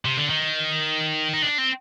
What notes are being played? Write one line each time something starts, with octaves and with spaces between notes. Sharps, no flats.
C3
D3
D#3
D#4
D4
C4